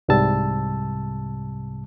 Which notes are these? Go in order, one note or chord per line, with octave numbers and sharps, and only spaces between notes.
C2 G#2 C3 G3 A5 E6